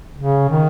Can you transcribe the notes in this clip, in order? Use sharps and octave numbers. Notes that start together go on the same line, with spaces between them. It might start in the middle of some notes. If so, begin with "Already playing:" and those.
C#3
D#3